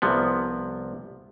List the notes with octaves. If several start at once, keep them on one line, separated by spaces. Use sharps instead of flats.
C2 C3 F3 B3